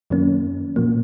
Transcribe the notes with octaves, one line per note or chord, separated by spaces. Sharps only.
F#2 D#3 F#3 A#3 C#4
A#2 F3 A#3